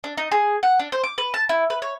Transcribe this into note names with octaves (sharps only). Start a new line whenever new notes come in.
D4
D#4
G#4
F#5
D4
C5
D6
B4
A5
E4
B4
C#5